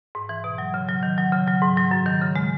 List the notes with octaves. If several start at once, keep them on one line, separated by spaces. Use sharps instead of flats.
G#2
E3
B2
F#3
C#3
F#3
D#3
F#3
C#3
F#3
G#2
F#3
F#2
D#3
C#3
G#3